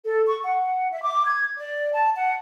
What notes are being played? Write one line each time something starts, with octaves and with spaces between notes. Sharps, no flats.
A4
C#6
F#5
E5
D6
G#6
D5
A5
F#5